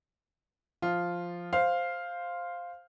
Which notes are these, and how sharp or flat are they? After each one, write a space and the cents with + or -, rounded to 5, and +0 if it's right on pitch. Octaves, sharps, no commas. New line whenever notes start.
F3 +0 F4 +0
C5 +0 F5 +0